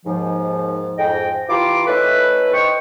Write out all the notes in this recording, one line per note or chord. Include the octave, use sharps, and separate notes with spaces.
D#2 G#2 F3
F2 G#2 D#5 G5
E3 F4 G4 A#5 C6 D6
A3 C#4 D#4 E4 A4 B4
C5 D#5 G5 C#6